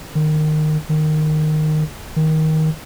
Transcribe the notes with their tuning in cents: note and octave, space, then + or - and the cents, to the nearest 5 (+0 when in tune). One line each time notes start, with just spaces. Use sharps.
D#3 -20
D#3 -15
D#3 +15